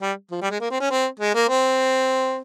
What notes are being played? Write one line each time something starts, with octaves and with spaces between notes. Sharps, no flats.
G3
F3
G3
G#3
A#3
C4
C#4
C4
G#3
A#3
C4